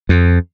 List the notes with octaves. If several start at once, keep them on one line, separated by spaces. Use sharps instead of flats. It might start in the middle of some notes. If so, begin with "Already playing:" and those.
F2